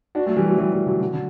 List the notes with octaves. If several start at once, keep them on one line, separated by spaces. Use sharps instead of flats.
D4 F#4
F#3 A3
E3 G3
F#3 A3
E3 G3
E3 G3
D3 F#3
D3 F#3
D3